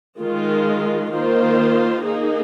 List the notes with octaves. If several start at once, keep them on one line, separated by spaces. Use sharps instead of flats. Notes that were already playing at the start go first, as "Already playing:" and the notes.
D#3 G#3 F4
D#3 A#3 F4 C5
A#3 D#4 G#4